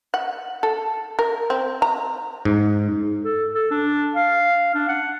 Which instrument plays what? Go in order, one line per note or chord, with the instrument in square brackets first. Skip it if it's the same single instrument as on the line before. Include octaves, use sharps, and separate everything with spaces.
[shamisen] F#5
A4
A#4
C4
A#5
[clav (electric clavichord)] G#2
[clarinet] A4
A4
D4
F5
D4
F#5